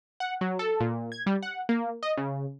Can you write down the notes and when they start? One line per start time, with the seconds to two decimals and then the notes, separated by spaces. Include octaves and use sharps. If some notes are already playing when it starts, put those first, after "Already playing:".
0.20 F#5
0.41 F#3
0.59 A4
0.80 A#2
1.12 G#6
1.26 G3
1.43 F#5
1.69 A#3
2.03 D#5
2.17 C#3